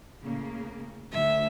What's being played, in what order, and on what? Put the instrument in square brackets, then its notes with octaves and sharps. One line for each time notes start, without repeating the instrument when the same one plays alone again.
[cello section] A2 C#3 A#3
[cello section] D2 [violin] E5